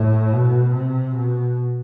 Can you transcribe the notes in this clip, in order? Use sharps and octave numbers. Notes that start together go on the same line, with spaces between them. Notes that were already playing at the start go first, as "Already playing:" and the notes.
Already playing: A2
B2
C3
B2